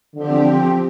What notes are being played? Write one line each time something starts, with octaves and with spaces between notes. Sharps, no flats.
D3 F3 C4 G4